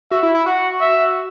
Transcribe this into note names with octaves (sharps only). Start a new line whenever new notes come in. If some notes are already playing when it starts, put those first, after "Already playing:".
F#4 E5
E4
E4
F#4 F#5
E5